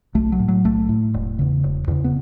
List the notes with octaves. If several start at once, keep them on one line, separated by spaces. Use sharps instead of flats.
B1 A3
F#3
A2
F#3
B1 A3
A2
E1
E2 C#3
E1
E2 C#3
B3